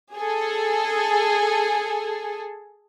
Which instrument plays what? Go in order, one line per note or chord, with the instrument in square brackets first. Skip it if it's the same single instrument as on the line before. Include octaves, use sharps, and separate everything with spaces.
[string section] G#4 A4